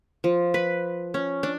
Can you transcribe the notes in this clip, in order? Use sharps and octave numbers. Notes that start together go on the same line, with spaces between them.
F3
B4
C#4
D4